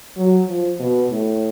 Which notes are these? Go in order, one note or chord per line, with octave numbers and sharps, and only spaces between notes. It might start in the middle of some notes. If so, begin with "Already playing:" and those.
F#3
F3
B2
A2